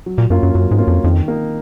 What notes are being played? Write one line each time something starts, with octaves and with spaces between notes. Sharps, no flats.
F#3
A#2
F#2 A#3 C#4 F4
F#2
F#2 F#3
G#2
A#3 C#4 F4
F2
F2 D#3
A#3 D#4